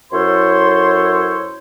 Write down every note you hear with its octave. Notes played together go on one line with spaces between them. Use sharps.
F#2 E4 A4 C5 C#5 C6